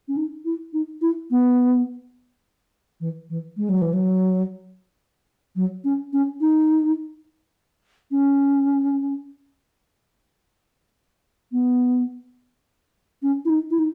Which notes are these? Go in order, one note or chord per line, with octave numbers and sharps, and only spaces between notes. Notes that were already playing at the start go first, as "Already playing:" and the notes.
C#4
D#4
E4
D#4
E4
B3
E3
E3
G#3
F#3
E3
F#3
F#3
C#4
C#4
D#4
C#4
B3
C#4
E4
D#4
E4
D#4